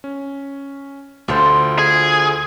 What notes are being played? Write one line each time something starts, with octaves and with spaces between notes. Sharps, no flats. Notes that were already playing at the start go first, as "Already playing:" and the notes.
C#4
D2 F4 A4 C5
G#4